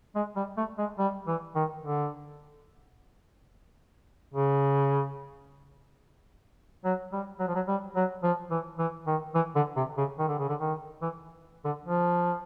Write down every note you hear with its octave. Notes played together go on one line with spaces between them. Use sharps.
G#3
G3
A3
G#3
G3
E3
D#3
D3
C#3
F#3
G3
F#3
F3
F#3
G3
F#3
F3
E3
E3
D#3
E3
D3
C3
C#3
D#3
D3
C#3
D3
D#3
E3
D3
F3